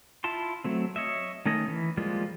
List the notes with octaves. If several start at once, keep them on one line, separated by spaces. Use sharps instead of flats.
E4 F4 A5 C6
F#3 A3 C4
C#5 D#5 E5
D#3 A3 C#4 D#5
E3
F3 G3 G#3 A#3 F4